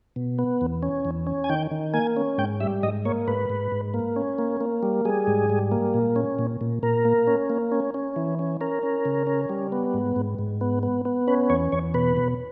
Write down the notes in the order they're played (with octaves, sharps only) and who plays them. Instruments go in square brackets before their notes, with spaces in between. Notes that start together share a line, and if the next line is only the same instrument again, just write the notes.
[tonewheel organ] B2
B3
E2
C#4
E2
C#4
G#5
D#3 G5
D#3
A#3 G#5
C#4
G#2 G5
G3 E5
G#2 D#5
A#3 C#5
G#2 B4
G#2
G#2
A#3
C#4
A#3
A#3
G3
G3 G#4
G#2
G3
A#3
A#2
C#4
A#2
A#2
A#2 A#4
A#3
C#4
A#3
C#4
C#4
E3
C#4
C#4 A#4
C#4
C#3
C#4
G3
B3
G#2
G#2
G#2
B3
B3
B3
C#4 B4
E2 C#5
E2 C#5
B2 B4
B2